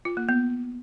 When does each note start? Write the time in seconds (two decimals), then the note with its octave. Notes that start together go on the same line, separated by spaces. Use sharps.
0.05 F4
0.17 A#3
0.29 B3